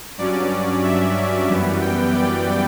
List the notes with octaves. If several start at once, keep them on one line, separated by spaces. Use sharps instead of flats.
G2 F#3 C#4 D5
E5
F#2 E3 G3 B3
G5
D5